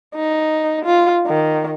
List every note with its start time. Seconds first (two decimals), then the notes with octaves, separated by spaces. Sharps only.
0.15 D#4
0.85 F4
1.26 D#3